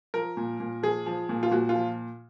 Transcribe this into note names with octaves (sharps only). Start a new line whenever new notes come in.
F3 A#4
A#2
A#2
F3 G#4
F3
A#2
F4
A#2 F#4
F4
F3